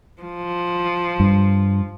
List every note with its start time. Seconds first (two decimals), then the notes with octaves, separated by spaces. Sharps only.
0.22 F3
1.20 G2